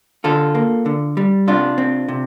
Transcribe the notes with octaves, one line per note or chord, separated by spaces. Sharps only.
D3 F4 A4
A#3
D3
G3
C3 D4 F4
C4
C3